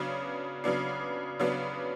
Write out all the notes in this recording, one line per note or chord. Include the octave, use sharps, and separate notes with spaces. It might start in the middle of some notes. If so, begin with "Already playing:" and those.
Already playing: C#3 F#3 B3 D4
C#3 F#3 B3 D4
C#3 F#3 B3 D4